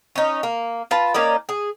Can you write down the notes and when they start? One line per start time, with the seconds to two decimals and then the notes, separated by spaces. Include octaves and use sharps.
0.16 C#4 D#4
0.43 A#3
0.91 F4 B4 A5
1.14 A#3 C#4 D#4 D5
1.49 G#4